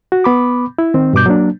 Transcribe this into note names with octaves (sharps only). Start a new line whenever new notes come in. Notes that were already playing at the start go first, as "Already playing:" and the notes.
F#4
B3 B5 D6
E4
D#3 C4
G2 B2 D6 G6
F#3 A#3 D4